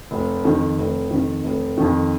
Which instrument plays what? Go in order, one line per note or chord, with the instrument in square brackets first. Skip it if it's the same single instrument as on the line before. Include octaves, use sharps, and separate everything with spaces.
[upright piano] F1
F2 D#3
F1
F2 D#3
F1
F2 D#3